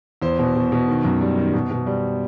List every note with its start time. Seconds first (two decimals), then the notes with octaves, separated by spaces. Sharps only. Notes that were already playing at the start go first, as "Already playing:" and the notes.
0.22 E2 C5
0.39 B2
0.55 B2
0.72 B2
0.88 D#3
1.05 F#2
1.21 G3
1.37 D#3
1.53 B2
1.70 B2
1.86 G3